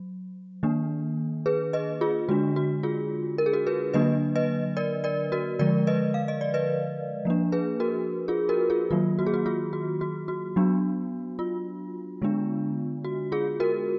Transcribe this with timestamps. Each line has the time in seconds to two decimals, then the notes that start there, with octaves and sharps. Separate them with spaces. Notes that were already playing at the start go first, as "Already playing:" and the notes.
Already playing: F#3
0.63 D#3 A#3 D4
1.46 G#4 B4
1.73 B4 D#5
2.01 F4 G#4
2.29 D3 G#3 D4 F#4
2.56 F#4
2.83 F4 G#4
3.38 A#4
3.46 G#4
3.53 F#4 A#4
3.67 G#4 B4
3.94 D3 F#3 A#3 D4 B4 D#5
4.35 B4 D#5
4.77 A#4 D5
5.04 A#4 D5
5.32 F#4 A#4
5.59 D3 F3 G#3 A#4 D5
5.87 B4 D#5
6.14 F5
6.28 D#5
6.41 D5
6.54 B4 D#5
7.25 F3 A#3 D4
7.52 G#4 B4
7.80 F#4 A#4
8.28 F4 G#4
8.49 F#4 A#4
8.70 F4 G#4
8.91 D#3 F#3 A#3 F4
9.19 F#4
9.27 G#4
9.34 F#4
9.46 F4 G#4
9.73 F#4
10.01 F#4
10.28 F#4
10.56 F#3 B3 D4
11.39 F4
12.22 D3 G#3 B3 D4
13.05 F#4
13.32 F4 G#4
13.60 F#4 A#4